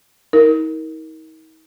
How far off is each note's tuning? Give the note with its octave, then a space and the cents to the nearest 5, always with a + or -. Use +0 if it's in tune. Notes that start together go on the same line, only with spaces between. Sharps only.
D#4 +45 A#4 +0